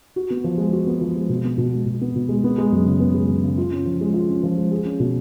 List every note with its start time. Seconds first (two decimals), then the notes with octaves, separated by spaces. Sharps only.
0.16 F#4
0.30 B3
0.44 F3
0.58 G#3
0.73 F#4
0.87 B3
1.01 F3
1.16 G#3
1.29 B2
1.44 B3
1.58 B2
1.73 G#3
1.86 B2
2.01 B3
2.16 B2
2.29 G#3
2.44 B3
2.58 G#3
2.72 F#2
2.86 C#3
3.00 B3
3.14 G#3
3.29 F#2
3.44 C#3
3.58 F4
3.71 C#4
3.85 F3
4.01 G#3
4.14 F4
4.29 C#4
4.43 F3
4.57 G#3
4.72 G#4
4.85 C#4
5.00 B2